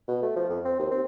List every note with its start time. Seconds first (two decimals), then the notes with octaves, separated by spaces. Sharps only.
0.08 B2
0.22 A3
0.36 F3
0.50 F2
0.65 C4
0.80 D#2
0.91 C4